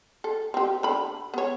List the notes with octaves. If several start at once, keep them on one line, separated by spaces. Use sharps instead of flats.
A4
C4 G4
D3 B5
B3 C#5